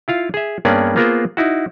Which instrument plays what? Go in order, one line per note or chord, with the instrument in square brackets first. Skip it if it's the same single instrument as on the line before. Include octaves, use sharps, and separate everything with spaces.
[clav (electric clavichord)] E4 F4 F5
G#4 E5
G2 A#3 B3 C#4 G#4 D5
A#3 B3 F4 G#4 A#4 C5
D#4 E4 F#4